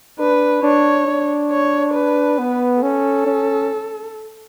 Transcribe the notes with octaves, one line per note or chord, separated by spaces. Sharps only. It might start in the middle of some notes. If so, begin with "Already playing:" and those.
D4 B4
D4 C#5
D4
C#5
B4
B3
C#4 A4
C#4